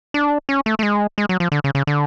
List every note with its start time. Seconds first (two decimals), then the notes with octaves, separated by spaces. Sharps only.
0.14 D4
0.49 C#4
0.66 A3
0.79 A3
0.83 G#3
1.18 G#3
1.29 F#3
1.40 F3
1.52 D3
1.64 C#3
1.75 C#3
1.87 D3